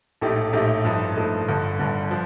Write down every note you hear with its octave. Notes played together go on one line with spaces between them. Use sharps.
A#1 A2 A3 D#4 G4
A#1 A2 A3 D#4 G4
G2 F3 A3 D#4
G2 F3 A3 D#4
G1 G2 D3
G1 G2 D3
F3